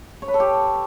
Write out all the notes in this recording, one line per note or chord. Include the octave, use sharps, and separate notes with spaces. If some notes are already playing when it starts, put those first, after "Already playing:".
C#5
B4
A4
G4